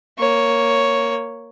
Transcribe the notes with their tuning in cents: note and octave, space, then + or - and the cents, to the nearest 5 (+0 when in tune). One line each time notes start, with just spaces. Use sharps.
A#3 +0 C#5 +0